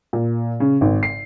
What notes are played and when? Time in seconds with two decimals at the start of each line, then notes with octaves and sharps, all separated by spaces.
0.13 A#2
0.60 C#3
0.81 G#1
1.03 C7